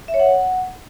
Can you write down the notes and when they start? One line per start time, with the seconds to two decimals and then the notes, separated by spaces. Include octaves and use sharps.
0.08 E5
0.14 C#5
0.19 F#5